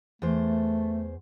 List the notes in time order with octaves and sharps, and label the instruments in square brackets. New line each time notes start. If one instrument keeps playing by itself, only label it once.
[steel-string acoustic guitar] E2 C5 [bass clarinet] A3